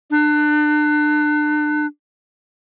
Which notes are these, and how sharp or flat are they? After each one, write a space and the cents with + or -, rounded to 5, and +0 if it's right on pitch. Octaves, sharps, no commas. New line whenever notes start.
D4 +35